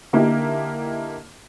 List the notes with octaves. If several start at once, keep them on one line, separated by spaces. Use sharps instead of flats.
D3 A#3 D#4 E4 G4